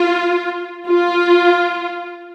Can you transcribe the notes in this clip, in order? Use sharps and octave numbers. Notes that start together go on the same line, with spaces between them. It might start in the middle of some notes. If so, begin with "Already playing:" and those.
Already playing: F4
F4